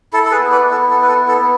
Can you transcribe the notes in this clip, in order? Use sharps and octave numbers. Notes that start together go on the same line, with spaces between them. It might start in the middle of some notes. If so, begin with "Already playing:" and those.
E4 A4
A4
G#4 B4
B3
B4 D5
E4
A4
B3 A4
B4
A4
E4
A4
B3